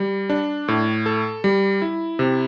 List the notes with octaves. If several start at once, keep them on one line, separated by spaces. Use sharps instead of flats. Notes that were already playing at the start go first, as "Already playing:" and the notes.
Already playing: G3
D4
A2
A4
G3
E4
C3